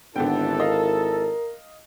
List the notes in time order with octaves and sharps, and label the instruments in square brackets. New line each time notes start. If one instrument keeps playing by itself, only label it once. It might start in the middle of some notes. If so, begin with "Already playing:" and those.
[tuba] G#1 [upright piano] D3 B3 G5 [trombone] D4 [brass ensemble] E4 A4
[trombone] A#4 [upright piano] D#5 F5